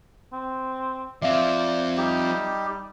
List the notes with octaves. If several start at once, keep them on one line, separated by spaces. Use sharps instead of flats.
C4
F3 C4 D5 E5 F5
G3 D#4 G4